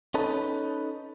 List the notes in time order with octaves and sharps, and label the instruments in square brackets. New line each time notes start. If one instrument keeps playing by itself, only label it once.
[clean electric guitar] C#4 D#4 A4 B4